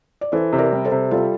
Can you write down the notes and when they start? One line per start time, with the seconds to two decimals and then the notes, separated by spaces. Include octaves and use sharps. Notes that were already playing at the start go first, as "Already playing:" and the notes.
0.21 D5
0.32 E3 A4 C5
0.53 C3
0.58 A#4 D5
0.72 G3
0.85 A4 C5
0.92 C3
1.11 G3 F4 A4